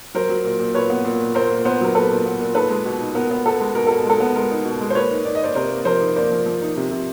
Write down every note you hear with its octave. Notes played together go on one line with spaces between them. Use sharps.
F#3 A#4 C5
F#3
A#2
A#2
A#2 B4 C#5
B3
A#2
A#2
A#2 A#4 C5
A#2
B3 A#4 C5
F#3 A#4
B3 A4 B4
A#2
B3
A#2
D#4 A4 B4
G#3
B2
D#4
B3 A#4
B3
B3 A4
G#3
B2 A#4
B2 A4
G#3 A4
B3
G#3 A#4
D#4
B2
G#3
C5
A#3 B4 C#5
D#4
D#4 D5
D#5
A#3 C5 D5
C3 A#4 C5
A#3
F3 A#4 C5
D#4
A#3 C5 D5
F3
F3
D#4
C3
C3